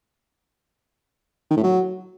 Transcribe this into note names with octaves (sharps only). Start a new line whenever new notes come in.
D#3
A2
F#3